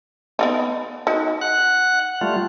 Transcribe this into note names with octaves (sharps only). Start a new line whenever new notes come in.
B3 D4 D#4
D#4 F#4
F#5 F#6
G3 A3 F4